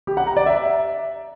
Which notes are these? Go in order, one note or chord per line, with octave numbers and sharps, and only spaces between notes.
G4
F#5
A#5
D5
E5